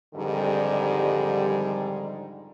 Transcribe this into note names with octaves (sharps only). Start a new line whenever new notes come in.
F2 G#2 D3 D#3 G3